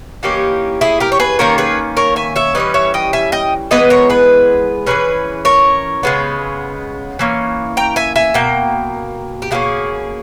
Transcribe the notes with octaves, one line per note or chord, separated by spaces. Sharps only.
E3 A#3 C#4 D#4 G4
E4 G#4
G4 A#4
C#5
G#4 B4
D#3 A#3 C#4 A#4 C#5
G#4 B4
A#4 C#5
E5 G#5
C#5 E5
E3 G3 C#4 B4 D#5
C#5 E5
D#5 G5
E5 G#5
D#5 G5
E3 G#3 B3 B4 D#5
A#4 C#5
G#4 B4
E3 G3 C#4 G#4 B4
A#4 C#5
C#3 G#3 B3
E3 A#3 C#4
G5 A#5
E5 G#5
E5 G#5
B2 A#3 G5
G4
B2 A#3 C#4 E4 G#4